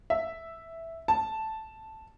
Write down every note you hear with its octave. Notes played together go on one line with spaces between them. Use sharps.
E5
A5